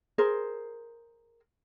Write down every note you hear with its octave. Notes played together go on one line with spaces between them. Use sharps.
G#4 A#4 C5